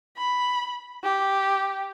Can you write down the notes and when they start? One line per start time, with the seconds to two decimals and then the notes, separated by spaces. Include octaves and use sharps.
0.17 B5
1.04 G4